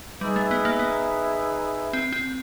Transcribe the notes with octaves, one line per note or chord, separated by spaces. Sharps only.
G3 D#4 G#4 B4 E5
A3
B3
A#3
B3
C4
C4